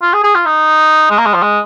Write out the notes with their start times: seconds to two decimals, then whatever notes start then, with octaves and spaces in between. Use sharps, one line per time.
0.02 F4
0.13 G#4
0.24 G#4
0.35 F4
0.46 D#4
1.10 G#3
1.18 A#3
1.26 G#3
1.34 F3
1.42 G#3